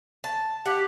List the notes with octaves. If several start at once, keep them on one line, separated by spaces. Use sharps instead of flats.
A5
G4 F#5